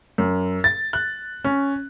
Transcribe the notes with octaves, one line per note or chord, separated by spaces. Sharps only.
F#2
A6
F#6
C#4